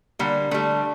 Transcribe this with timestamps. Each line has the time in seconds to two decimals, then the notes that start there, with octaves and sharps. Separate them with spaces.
0.19 D3 G3 A#3
0.51 D3 G3 A3